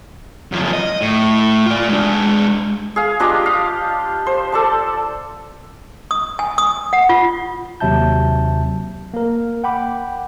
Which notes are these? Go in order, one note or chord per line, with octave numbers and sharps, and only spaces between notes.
F#2 F3
D#5
A2
F4 D5
G#3 D4
G#4 F5
D4 F4 G4 D#5
F5
C5
A4 D5 A5
D#6
G#5
D#6
F#5
F4
D#2 C3 F#3 E5 A5 G6
A#3 A#4
F#5 G5 B5 D6